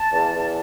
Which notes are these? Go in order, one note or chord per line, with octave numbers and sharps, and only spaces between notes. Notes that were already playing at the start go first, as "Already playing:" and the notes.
Already playing: A5
E2
E2